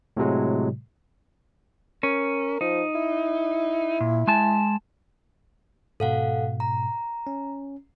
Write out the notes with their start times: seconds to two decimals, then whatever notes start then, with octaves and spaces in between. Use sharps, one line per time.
0.17 A2 C3 F#3 G#3
2.03 C#4 A#4
2.61 F3 D#4
2.95 E4
4.01 A#2
4.27 G#3 G#5 A5
6.00 G#2 B2 A4 F5 F#5
6.60 A#5
7.27 C#4